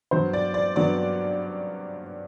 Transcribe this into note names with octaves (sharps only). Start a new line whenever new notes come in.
G2 F#3 B3 C5
D5
D5
G2 F#3 B3 D5